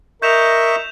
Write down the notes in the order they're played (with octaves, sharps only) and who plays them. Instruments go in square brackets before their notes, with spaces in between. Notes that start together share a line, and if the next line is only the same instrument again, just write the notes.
[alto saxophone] A#4 [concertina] D#5 E5 C#6 [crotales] G6 E7 F7